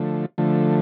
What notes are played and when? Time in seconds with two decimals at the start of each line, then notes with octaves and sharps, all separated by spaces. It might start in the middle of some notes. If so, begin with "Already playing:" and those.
Already playing: D3 F3 A3
0.38 D3 F3 A3